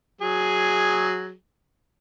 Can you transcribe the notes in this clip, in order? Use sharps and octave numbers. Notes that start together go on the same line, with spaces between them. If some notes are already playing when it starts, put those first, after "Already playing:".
F#3 G#4